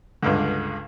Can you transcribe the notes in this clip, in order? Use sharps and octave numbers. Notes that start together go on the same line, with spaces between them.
C#2 G2 D3